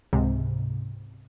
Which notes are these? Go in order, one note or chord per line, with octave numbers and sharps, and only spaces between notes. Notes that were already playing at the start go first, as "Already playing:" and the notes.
C#2 G#2 C3